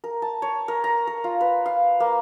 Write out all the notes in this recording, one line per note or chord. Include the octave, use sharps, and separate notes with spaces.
A#4
A5
C#5
A#4
A#5
A#4
F4
B4
F5
A#3